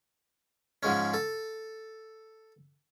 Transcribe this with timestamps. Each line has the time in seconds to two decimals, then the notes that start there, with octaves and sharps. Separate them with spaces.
0.83 G#2 F3 G#3 C#4
1.14 A4